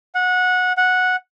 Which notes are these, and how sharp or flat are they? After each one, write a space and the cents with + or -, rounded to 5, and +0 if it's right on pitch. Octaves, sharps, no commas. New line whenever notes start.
F#5 -20
F#5 -10